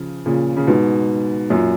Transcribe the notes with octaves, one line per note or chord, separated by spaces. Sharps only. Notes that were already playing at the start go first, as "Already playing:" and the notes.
Already playing: C#3 F3
A#2 C#3
C#3
G#2 B2
F#2 A#2